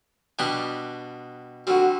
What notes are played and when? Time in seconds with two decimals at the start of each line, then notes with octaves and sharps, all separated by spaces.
0.39 B2 G3 B3 D4 G4
1.67 D3 G3 C4 F#4